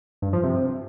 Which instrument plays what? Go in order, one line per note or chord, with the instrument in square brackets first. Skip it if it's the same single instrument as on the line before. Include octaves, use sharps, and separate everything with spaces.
[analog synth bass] G2
F3
C3